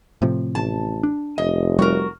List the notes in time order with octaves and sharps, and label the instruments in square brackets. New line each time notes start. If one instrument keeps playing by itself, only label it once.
[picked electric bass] A2 C3 F3
[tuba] A1 [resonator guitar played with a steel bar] A5
[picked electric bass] D4
[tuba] F1 [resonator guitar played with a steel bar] D#5
[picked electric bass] G3 [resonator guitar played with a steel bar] F#4 A#4